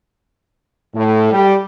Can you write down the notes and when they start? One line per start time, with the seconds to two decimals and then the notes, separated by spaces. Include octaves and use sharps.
0.94 A2
1.32 G3 G4